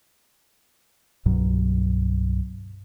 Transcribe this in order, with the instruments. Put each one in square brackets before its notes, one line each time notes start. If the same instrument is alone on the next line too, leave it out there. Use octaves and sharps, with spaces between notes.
[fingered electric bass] C2 G2 B2 F#3